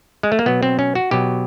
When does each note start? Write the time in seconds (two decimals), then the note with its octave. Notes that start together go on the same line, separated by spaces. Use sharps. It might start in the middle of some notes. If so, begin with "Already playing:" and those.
0.23 G#3
0.32 A3
0.39 A#3
0.46 B2 F#3 B3
0.63 C4
0.79 C#4
0.95 F#4
1.11 B2 F#3 G4